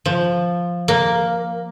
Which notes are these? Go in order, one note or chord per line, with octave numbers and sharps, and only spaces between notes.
F3
A#3